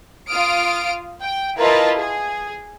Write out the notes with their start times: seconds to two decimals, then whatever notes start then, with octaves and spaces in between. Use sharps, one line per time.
0.30 F4 D#6 F6 D7
1.20 G5
1.58 E4 F4 A#4 B4 D#5 A5
1.98 G#4